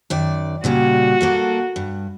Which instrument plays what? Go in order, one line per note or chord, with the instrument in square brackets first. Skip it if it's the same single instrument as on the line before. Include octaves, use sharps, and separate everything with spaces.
[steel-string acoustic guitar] F#2 D#3 D5
[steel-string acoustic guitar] A#2 C#3 G3 [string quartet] F#4
[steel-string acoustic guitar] A#3 A4 F5
G2